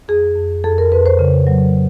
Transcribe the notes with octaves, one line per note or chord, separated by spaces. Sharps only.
F2 G#4
F2
F2 A4
A#4
F2 B4
C5
C#3
F#3